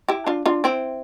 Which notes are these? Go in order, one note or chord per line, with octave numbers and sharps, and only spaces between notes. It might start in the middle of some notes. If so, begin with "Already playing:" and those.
E4 G4
D4 F4
D4 F4
C4 E4